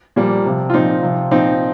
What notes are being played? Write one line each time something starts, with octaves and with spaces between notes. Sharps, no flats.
A#2 F3 G3 A#3
C3 F3
F4
A#2 F3 C4 D#4
C3 F3
A#2 F3 C4 D#4